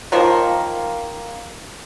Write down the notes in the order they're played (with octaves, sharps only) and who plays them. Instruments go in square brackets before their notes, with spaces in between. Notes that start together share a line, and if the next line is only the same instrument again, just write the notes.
[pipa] D#3 F3 A#3